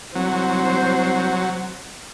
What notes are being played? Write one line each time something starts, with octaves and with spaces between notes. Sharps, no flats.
C2 F#3 C5